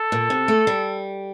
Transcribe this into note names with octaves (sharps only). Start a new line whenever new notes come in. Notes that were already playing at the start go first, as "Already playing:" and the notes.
Already playing: A4
A#2
C3
A3
G3